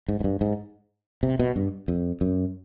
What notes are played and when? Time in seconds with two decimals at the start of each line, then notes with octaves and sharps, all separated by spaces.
0.08 G#2
0.20 G#2
0.24 G2
0.41 G#2
1.23 C3
1.39 B2
1.56 G2
1.88 F2
2.21 F#2